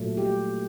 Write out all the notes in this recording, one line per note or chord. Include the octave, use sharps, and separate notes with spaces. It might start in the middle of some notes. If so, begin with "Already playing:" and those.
Already playing: A#2 F#3 A3
G4